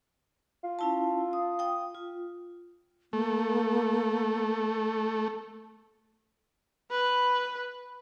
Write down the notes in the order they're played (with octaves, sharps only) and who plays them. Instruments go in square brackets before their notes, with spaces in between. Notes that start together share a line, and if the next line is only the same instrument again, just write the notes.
[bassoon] F4
[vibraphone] C#4 E4 A5
D#6
G5 D#6
F4
[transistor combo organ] A3 [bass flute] A#3
[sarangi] B4